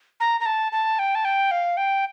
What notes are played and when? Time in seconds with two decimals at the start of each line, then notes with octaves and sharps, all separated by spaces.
0.20 A#5
0.40 A#5
0.46 A5
0.72 A5
0.99 G5
1.15 A5
1.25 G5
1.51 F5
1.77 G5